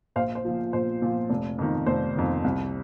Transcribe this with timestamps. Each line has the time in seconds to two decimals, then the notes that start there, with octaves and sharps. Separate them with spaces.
0.16 A#1 C5 F5
0.35 C5
0.45 A#2 F3
0.73 A#1 C5
1.02 A#2 F3
1.30 F1
1.59 F2 D#3
1.86 F1 C5
2.16 F2 D#3
2.44 C2